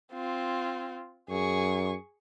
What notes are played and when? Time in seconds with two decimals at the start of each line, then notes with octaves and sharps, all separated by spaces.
0.13 C4 F4
1.30 F#2 G#4 C#6